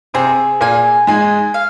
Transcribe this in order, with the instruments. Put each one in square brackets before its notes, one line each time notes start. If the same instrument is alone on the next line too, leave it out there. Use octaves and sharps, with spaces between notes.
[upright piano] C3 C4 [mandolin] G#4
[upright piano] A#2 A#3 [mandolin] G#5
[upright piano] G#2 G#3 [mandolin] G#5
[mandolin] F5